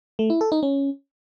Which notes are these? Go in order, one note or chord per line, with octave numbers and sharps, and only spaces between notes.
A3
E4
A4
D#4
C#4